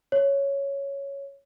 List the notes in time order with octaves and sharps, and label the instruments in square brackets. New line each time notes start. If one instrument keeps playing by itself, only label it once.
[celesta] C#5